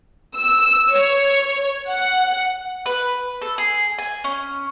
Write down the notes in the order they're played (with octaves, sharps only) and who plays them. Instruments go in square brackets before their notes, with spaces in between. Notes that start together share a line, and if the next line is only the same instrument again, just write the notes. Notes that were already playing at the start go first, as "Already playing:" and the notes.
[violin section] E6
C#5
F#5
[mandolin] B4
A4
G#4
G#5
C#4